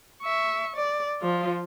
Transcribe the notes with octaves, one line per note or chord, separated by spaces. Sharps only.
E5 C#6
D5
F3 F4